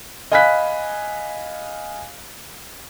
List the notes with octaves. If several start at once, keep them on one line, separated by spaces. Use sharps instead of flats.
D#5 F5 G#5 B5 F#6 B6